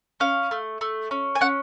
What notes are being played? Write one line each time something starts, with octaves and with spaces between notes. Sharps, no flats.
C#4 F5
A3
A3
C#4
G#5
C#4 F#5